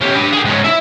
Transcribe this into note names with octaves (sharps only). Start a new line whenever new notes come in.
C#4 G4
D4 B4
G#4 G5
G#2 C#4
E4 E5